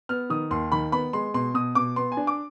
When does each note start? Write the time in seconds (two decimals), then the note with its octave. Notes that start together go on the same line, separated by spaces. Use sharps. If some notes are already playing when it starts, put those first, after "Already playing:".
0.09 B3 F6
0.30 D#3 D#6
0.51 D#2 C6
0.72 D#3 B5
0.92 B3 B5
1.13 G#3 C6
1.34 B2 C6
1.54 B2 D#6
1.75 B2 D6
1.96 B3 C6
2.12 G#5
2.17 D4
2.27 D6